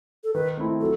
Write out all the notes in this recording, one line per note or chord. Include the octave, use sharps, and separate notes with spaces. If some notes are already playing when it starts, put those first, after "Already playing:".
A4
D#3 B4
A3 C4 E4
F#3 A4